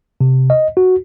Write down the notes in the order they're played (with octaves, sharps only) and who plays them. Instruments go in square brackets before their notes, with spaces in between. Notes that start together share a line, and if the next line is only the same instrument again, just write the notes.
[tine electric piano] C3
D#5
F#4